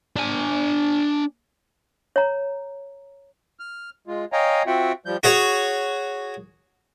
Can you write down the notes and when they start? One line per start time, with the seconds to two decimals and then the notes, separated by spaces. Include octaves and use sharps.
0.16 D4 G#5
2.16 C#5 A#5
3.60 F6
4.07 G#3 F4
4.33 C#5 D#5 F5 G5 G#5 A#5
4.67 C4 F4 F#4 E5 F#5 G5
5.06 F3 G3 G6
5.23 F#4 G#4 C#5